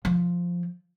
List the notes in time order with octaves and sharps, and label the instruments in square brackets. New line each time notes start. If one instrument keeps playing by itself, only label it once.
[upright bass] F3